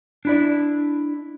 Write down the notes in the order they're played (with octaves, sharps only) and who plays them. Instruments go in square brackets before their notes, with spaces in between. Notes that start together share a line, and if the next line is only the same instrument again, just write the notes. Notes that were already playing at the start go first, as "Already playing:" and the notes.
[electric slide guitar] D4 E4 D5